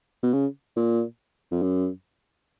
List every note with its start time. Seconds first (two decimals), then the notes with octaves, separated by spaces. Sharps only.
0.23 B2
0.33 C#3
0.76 A#2
1.51 F2
1.62 F#2